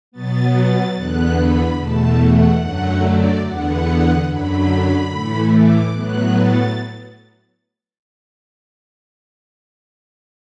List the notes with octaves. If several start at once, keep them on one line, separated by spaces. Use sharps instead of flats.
B2 F#3 B3 A6
A6
E2 D3 B3 F#6
B5
E2 B2 A3 A5
F#5
F#2 D3 F#3 A3 F#5
D5
E2 D3 B3 F#5
F#2 D3 F#3 B5
A2 E3 A3
D6
A2 F#3 B3 F#6
A6